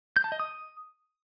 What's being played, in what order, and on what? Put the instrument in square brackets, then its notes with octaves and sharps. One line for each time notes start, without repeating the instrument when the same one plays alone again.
[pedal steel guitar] G6
A5
D#5
D#6